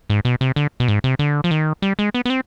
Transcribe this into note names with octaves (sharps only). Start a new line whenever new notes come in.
G#2
B2
C3
D3
B2
G#2
C3
D3
F3
D#3
G3
G#3
B3
B3
C4